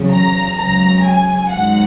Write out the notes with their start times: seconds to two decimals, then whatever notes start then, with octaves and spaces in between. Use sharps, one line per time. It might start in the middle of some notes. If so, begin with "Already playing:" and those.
Already playing: E2 C#3 F#3
0.12 A#5
0.57 C#2 C#3 F#3 A#5
1.05 G#5
1.51 G#2 D#3 F#3 F#5